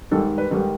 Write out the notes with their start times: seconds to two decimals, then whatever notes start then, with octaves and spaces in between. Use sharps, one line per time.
0.11 G#2 D#3 G3 A4
0.38 B4
0.51 G#2 D#3 G3 A4